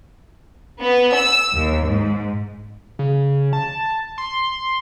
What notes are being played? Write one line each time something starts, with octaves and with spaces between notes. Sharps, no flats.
B3
E6
D#2
G#2
C#3
A5
C6